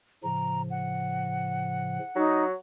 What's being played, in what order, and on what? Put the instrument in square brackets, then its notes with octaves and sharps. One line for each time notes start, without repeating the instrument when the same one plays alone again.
[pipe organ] A2 C#3 F3 [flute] A#5
[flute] F#5
[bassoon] F#3 [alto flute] D#4